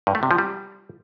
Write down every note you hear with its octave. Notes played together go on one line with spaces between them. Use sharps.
G2
A3
C3
F3
G3